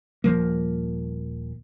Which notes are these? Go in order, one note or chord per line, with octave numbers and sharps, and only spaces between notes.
D#1 F3 A#3